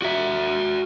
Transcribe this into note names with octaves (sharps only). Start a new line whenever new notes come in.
F#4 E5